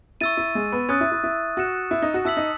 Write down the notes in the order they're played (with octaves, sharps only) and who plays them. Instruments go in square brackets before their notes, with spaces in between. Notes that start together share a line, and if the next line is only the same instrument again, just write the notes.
[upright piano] E4 [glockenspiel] C#6 E6 A6 D#7
[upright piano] E4
G#3
B3
[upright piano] C#4 [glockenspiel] D#6 F#6 A6 D#7
[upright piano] E4
E4
E4
[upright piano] F#4 [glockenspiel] F#6 C#7 E7
[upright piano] E4
D#4
F#4
[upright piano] E4 [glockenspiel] A5 E6 B6 F#7
[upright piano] D#4